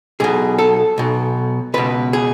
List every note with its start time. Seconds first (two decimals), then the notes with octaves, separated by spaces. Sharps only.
0.20 B1 B2 G#4
0.58 A4
0.98 B1 B2
1.74 C#2 B2 B4
2.13 G#4